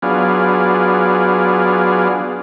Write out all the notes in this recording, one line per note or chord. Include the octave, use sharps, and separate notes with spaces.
F#3 B3 D4 F4 G#4